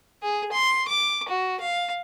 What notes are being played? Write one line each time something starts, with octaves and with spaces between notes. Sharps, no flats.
G#4
C6
D6
F#4
F5